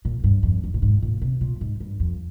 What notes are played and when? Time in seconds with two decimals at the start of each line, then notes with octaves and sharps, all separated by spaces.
0.05 A#2
0.24 G2
0.43 F2
0.64 G2
0.74 A#2
0.82 G#2
1.02 A#2
1.22 C3
1.41 A#2
1.61 G#2
1.80 G2
2.00 F2